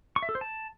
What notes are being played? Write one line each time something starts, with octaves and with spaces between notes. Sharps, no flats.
C#6
E5
A4
C5
A5